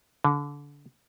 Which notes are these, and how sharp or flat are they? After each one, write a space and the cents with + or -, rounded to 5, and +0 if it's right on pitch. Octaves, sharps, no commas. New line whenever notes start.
D3 -25